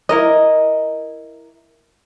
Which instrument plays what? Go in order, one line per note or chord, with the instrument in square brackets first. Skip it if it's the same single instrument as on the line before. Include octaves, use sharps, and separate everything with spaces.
[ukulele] E4 A#4 D#5